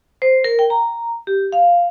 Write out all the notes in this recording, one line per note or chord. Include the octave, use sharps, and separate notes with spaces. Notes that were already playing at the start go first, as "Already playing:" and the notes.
C5
A#4
G5
A#5
G4
F5